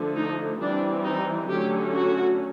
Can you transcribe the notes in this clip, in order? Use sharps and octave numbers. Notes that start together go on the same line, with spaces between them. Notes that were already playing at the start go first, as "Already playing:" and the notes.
Already playing: D3 F3 A3
D#4
E3 G3 C4 D4
D#4
D3 F#3 A3 C#4 G4
F#4